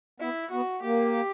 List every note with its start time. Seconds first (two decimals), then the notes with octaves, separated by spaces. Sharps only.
0.20 B3 E4
0.51 B3 F#4
0.82 A#3 G4